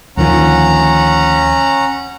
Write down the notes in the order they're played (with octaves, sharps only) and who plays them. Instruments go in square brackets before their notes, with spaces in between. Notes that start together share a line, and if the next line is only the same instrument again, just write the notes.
[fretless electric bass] D2 D#3 F3 [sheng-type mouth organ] C#4 F#5 A#5